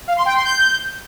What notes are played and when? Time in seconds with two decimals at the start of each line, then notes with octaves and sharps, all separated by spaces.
0.07 F5
0.17 C6
0.26 G5
0.35 C6
0.44 G6